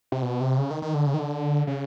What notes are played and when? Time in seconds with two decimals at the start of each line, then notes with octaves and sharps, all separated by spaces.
0.12 C3
0.22 B2
0.41 C3
0.58 C#3
0.71 D#3
0.82 D#3
0.94 D3
1.06 C#3
1.14 D#3
1.19 D3
1.67 C#3